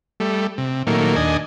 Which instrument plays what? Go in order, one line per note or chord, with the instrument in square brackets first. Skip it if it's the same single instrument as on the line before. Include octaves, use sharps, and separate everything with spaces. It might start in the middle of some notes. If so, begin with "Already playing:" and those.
[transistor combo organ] G3 A3
C3
A#2 D#3 F#3 A3 A#3
D#2 D4 D#5 G#5